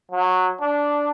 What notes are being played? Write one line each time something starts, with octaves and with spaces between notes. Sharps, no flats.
F#3
D4